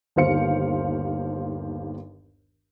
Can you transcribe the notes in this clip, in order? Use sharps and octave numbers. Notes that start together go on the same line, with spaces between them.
G1 D#2 C5 F5 C#7